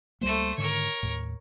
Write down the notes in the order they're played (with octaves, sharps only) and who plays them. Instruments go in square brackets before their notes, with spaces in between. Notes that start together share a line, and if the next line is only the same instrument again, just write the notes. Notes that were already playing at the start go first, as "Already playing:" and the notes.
[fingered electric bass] C#2 G3 A#3 [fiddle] A3 C5
[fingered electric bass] G#2 D3 D#3 [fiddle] A#4 C#5
[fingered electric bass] D#2 A2